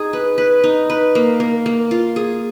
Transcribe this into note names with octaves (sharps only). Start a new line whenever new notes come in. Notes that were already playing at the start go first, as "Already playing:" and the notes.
Already playing: D#4 G#4
B4
B4
D#4
B4
A#3
A#3
A#3
F4
G#4